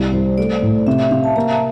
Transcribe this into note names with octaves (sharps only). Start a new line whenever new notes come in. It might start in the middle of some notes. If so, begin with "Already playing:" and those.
Already playing: C2 D5
C2 C5
A3 D5
A2
C3 E5
E5
C3 F5
A5
A#3 A#5